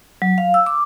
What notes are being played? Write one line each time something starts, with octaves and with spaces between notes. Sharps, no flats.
F#3
F5
E6
D6